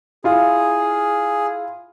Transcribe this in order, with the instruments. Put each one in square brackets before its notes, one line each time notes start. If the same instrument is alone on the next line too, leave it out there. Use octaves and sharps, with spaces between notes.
[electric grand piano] E4 F4 F5 [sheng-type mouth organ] G#4